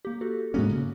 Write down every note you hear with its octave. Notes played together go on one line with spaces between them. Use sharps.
A#3 G4
F#4 A4
G#2 G#3 A#3 B3 C#4 F#4
C#3